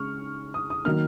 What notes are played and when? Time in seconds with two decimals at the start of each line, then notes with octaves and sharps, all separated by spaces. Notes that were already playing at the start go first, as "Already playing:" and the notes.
Already playing: C#3 G#3 C#6 F6
0.54 D#6
0.70 D#6
0.85 D#3 F#3 A#3 F6